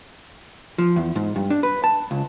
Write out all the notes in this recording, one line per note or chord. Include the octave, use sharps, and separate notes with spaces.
F3
E2
G#2
G2
D4
B4
A5
C#2